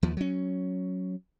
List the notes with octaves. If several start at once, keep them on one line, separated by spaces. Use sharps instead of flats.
D#2 F3
F#3 C#4